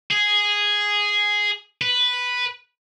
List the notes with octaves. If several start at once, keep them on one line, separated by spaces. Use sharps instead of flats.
G#4
B4